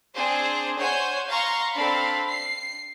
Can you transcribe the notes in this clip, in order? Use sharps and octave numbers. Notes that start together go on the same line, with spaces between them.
C4 D4 G#4 C5
C5 C#5 F#5 G#5 G6
F5 A#5 C6 C#6
C4 D4 A4 F5 B5
C7